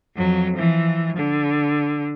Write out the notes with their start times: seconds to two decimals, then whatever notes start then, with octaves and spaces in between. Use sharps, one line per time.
0.16 F2 F#3
0.56 E3 F3
1.17 D3